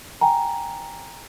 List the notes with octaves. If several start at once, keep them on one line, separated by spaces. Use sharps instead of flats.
G5 G#5 A#5